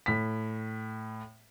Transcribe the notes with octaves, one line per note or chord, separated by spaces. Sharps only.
A2 B6